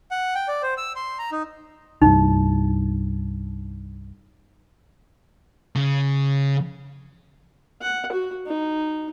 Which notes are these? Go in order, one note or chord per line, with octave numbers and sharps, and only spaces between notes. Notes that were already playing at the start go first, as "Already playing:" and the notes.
F#5
G5
D5
C5
E6
C6
A#5
D#4
C2 G2 D#4
C#3
F#5
F#4
D#4